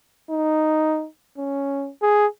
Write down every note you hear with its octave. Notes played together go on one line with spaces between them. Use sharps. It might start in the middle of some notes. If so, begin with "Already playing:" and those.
D#4
C#4
G#4